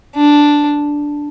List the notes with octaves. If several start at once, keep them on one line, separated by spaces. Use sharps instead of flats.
D4